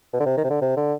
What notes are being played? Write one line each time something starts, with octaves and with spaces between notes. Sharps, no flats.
B2
D3
C3
D#3
C3
D3
C3
D3